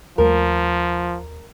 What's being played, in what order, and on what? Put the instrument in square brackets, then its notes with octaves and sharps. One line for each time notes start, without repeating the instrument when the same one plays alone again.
[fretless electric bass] D#2 G3 A3 [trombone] F3 [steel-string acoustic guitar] A#4